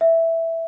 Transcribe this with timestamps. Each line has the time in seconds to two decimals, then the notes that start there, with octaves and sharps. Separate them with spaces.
0.01 E5